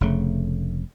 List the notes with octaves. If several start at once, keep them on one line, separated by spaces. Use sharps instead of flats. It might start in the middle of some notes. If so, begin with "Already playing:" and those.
F1 C#3 A3